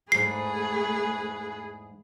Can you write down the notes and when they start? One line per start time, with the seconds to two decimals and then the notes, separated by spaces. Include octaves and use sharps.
0.12 E2 G#2 A3 G#4 B4 C7